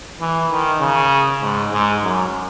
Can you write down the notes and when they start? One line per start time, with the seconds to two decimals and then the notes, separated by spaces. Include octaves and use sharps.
0.20 E3
0.51 D#3
0.81 C#3
1.42 G#2
1.73 G#2
2.03 F#2